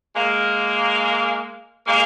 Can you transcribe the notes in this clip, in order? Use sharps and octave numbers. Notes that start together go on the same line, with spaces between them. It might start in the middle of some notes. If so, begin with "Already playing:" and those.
G#3 A#3
G#3 A#3